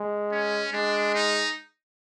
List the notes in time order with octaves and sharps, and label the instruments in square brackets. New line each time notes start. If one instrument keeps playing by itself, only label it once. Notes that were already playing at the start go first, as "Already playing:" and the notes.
Already playing: [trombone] G#3
[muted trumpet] C#4
[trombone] G#3 [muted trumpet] D4
[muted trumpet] D#4